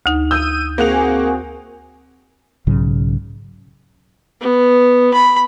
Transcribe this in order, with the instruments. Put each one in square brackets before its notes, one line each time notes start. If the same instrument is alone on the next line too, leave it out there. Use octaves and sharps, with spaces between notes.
[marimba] D2 D#4
[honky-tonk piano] D#6 E6 G6 [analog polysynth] D#7
[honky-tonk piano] A#3 F#5 F7 [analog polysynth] C4 F#4 G#4
[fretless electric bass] B1 G#2 C#3 F#3
[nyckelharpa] B3
B5